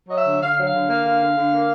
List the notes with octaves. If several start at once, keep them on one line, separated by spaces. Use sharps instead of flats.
F#3 D#5
E5
D3
D3 F5
F#3
F5
D3
A#3 F5
D3
D3
D3
A#3